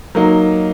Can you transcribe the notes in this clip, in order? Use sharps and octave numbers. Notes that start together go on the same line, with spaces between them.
F#3 A#3 D#4